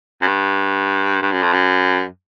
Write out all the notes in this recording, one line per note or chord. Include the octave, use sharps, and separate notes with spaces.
F#2
G2
G2
F#2
F2
F#2